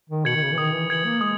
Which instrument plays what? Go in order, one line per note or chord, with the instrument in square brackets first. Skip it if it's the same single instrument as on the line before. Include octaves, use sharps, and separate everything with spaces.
[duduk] D#3
[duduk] B2 [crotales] G#6 C#7 F#7
[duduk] D#3
C#3
E3
[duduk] D#3 [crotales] D#6
[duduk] E3
[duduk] E3 [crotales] G#6 C#7 F#7
[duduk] A#3
[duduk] G#3 [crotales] D#6